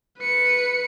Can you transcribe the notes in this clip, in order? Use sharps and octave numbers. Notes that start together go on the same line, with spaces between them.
B4 C#7